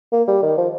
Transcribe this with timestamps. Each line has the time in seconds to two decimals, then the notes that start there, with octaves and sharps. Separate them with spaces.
0.13 A#3
0.28 G3
0.43 D#3
0.58 F3